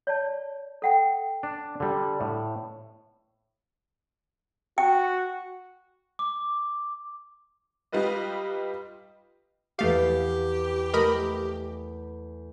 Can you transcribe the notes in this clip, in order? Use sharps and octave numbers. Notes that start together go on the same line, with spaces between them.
C#5 D5 A5
A4 F#5 G5
D4
D3 G3
A2
F#4 G5
D6
G3 D#4 F4 B4 D#5
E2 A3 G4 F5 D#6
A3 A#4 D#5 B5